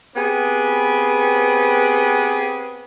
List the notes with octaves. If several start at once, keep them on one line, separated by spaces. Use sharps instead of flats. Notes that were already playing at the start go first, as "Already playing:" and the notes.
B3 C4 G4 G#4 B4